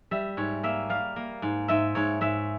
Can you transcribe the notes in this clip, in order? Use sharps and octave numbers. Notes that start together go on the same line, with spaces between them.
G3 E5
G#2 C#5
A#3 E5
G3 F5
A#3
G#2
G#2 E5
G#2 C#5
G#2 E5